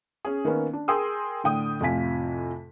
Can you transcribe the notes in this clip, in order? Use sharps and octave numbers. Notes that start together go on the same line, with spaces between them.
C#4 G#4
D#3 A#3 B3 C#4
D4
G#4 A#4 G5 C6 D#6 E6
A2 D3 G5 D#6
F2 A2 C3 F4 G#5 B6